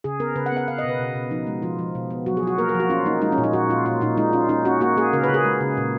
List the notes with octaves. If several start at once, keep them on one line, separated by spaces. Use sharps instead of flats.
C#3 G#4
B3 A#4
C#3 B4
F#5
B3
F#5
C#4 F5
D#5
B2
B4
B2
B2
F3 D#4
G#3
F3 F4
F3
B2
B3
F#3 F#4
G#4
F#3 F#4
A#3 A#4
A#4
F3
F#4
C#4 F4
A#3 D#4
G#3 D#4
C#4
A#2
D#4
A#2 F#4
A#2 F4
A#2 F4
A#2 D#4
G#3 D#4
C#4 F4
C#4 D#4
C#4 F#4
A#3 F#4
A#3 G#4
C#3 A#4
B4
C#3
G#4
G#3
C#3
A#2